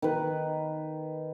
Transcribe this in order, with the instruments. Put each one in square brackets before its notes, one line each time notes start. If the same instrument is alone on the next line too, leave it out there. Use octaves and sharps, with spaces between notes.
[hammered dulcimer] D#3 B4